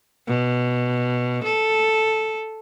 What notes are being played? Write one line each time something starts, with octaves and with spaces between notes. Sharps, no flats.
B2
A4